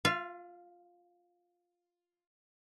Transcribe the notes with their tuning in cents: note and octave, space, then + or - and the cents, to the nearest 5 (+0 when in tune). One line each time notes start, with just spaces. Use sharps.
F4 +10 F5 -45